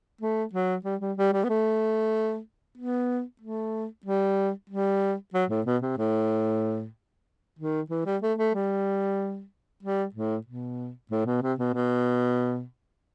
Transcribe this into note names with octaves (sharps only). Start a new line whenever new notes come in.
A3
F#3
G3
G3
G3
G3
B3
A3
B3
A3
G3
G3
F#3
A2
B2
C3
A2
D#3
E3
G3
A3
A3
G3
G3
A2
B2
A2
B2
C3
B2
B2